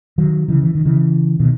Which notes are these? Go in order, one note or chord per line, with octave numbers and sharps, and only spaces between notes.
D#3 F#3
C#3 E3
E3
D#3
C#3 E3
B2 D#3